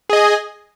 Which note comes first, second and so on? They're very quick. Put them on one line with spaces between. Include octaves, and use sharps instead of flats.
G#4 D#5 G#5